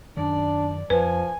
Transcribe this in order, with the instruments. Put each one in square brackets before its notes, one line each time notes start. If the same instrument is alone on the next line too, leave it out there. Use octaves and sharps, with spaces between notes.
[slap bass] F#2 D#3 [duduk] D4 [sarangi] D5
[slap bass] F2 [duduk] F3 [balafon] B4 [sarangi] G#5